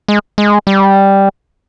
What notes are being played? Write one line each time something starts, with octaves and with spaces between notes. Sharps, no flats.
G#3
G#3
G3